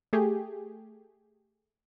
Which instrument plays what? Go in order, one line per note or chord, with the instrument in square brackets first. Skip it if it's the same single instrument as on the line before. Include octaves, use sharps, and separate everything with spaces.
[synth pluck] A3 G4 G#4